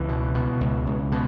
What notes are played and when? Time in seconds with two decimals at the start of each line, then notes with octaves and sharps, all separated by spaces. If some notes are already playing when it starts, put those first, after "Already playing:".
Already playing: C#2 E3
0.09 B2
0.34 B2
0.61 C#2
0.87 C#2
1.12 B2